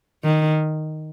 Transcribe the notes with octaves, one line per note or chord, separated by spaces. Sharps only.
D#3